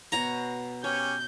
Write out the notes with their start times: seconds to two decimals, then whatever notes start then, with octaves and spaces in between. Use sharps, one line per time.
0.12 B2 F#4 C#5 A#5
0.84 C#4 G4 C#5 G6